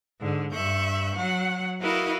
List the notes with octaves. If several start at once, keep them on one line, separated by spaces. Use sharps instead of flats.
G#2 D3
G2 E5 C#6 F#6 G6
F#3 F#5
E4 F#4 A#4 B4 D#5 F5